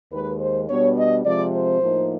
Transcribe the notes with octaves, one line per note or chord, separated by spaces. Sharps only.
D#2 D#3 G#3 B4
C5
B2 G3 B3 D4 C#5
D#5
C3 F3 G#3 C4 D5
C5
A2 F3 A#3 D#4